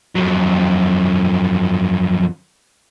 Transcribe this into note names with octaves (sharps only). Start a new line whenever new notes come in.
F2 F#3